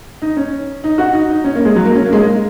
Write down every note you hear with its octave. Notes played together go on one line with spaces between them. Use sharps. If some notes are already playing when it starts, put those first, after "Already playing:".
D#4
C#4
D#4
F#4
D#4
D#4
C#4
A#3
G#3
F#3
A#3
C#4
A#3
G#3
A#3